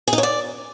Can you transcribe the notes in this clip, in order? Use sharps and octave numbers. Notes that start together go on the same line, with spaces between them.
G#4
D#4
C#5
D5